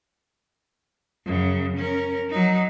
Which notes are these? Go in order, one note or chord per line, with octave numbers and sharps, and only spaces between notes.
F#2 C#3
C#4 A#4
F#3 D#4